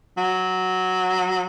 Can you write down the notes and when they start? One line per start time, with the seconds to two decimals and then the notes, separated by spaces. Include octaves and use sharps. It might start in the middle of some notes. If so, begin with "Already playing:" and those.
0.18 F#3